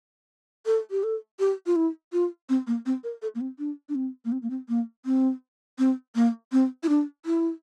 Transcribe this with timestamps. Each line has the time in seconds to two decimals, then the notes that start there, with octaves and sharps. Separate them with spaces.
0.66 A4
0.91 G4
1.03 A4
1.39 G4
1.66 F4
1.76 E4
2.13 F4
2.49 C4
2.67 A#3
2.86 C4
3.04 A#4
3.22 A4
3.35 A#3
3.41 C4
3.59 D4
3.89 D4
3.95 C4
4.25 A#3
4.32 C4
4.43 A#3
4.50 C4
4.69 A#3
5.06 C4
5.79 C4
6.15 A#3
6.52 C4
6.83 E4
6.89 D4
7.26 E4